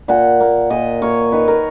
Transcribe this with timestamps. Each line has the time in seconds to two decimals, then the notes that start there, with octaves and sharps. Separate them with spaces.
0.08 A#2 F#5
0.40 A#3
0.70 A#2 D#5
1.01 A#3 C#5
1.32 D#3 B4
1.48 A#4